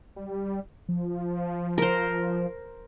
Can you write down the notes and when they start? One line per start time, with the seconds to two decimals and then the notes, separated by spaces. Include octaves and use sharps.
0.16 G3
0.89 F3
1.78 A#4 C5